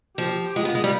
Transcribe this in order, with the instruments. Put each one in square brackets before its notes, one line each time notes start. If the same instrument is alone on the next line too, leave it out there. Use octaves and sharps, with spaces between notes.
[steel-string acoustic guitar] F3 [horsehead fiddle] G4
[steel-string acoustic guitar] G#3 [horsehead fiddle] F4
[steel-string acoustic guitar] B3
G#3
G3